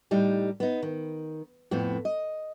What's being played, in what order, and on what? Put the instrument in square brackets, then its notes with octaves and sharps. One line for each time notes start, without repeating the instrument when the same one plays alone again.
[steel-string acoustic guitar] A2 G3 D#4
B3 D#4
D#3
F2 A2 B3 C4
D#5